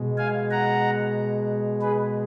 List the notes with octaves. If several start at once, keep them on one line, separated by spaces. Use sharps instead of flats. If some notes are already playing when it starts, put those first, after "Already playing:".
Already playing: B2 G#3
F5 G#5
F#5 A#5
G#4 B4